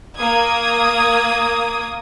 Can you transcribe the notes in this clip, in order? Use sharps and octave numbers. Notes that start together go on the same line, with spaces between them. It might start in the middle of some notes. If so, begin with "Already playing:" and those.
A#3 D#6 G#6